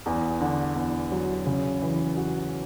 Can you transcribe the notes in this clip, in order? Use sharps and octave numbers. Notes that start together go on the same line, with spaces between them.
E2
D3
E2
F#3
C#3
E3
F#4